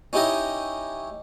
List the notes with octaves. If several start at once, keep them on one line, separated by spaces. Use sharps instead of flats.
C#4 D#4 E4 G4 C#5 D#5